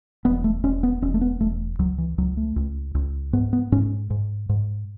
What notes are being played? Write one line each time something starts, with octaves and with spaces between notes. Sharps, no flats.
E1 B3
A3
E1 C#4
B3
E1 C#4
A3
B3
E1 A3
C#2 F#3
E3
C#2 F#3
A3
C#2
C#2
G#2 B3
B3
G#2 C#4
G#2
G#2